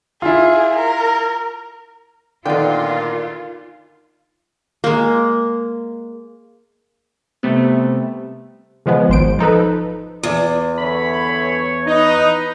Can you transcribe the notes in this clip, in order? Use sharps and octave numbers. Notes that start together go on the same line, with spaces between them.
E4 F4 G#4
A#4
A#2 D3 D#3 B3 F4 G5
G#3 A#3
C3 G3 A3 B3
C#3 F3 G#3 B3
G#1 C5 D7
F3 D#4 A4 B4
E2 D5
D3 E3 C#5 B5
D#4 B4